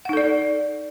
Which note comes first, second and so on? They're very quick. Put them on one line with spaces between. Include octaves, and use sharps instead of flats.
F#5 D#4 A4 D5